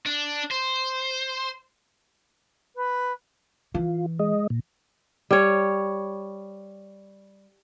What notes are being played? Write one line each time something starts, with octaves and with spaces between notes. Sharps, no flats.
D4
C5
B4
E3 F4
G#3 D#5
A#2
G3 C#5